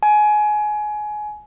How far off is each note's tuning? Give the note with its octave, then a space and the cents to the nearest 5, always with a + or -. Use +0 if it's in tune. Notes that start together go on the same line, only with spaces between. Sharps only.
G#5 +20